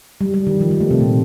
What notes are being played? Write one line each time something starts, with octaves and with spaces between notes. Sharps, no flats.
G3
G3
D#3
F3
G3
A3
C3 C4
A#2 A#3